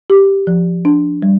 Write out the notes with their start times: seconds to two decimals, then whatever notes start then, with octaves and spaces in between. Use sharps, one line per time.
0.10 G4
0.47 F3
0.85 D4
1.22 G3